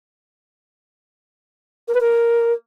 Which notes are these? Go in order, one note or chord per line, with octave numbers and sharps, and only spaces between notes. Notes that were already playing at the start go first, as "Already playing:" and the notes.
A#4
B4
A#4